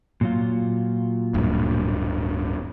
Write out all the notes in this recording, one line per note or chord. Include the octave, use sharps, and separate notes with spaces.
A#2 F#3 F4
D1 G2